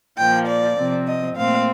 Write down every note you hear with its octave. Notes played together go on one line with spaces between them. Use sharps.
A#2 F3 A#3 G5
D5
C3 F3 C4
D#5
A#2 A3 C4 F5